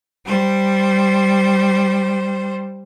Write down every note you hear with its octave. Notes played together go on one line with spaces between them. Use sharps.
G3 C5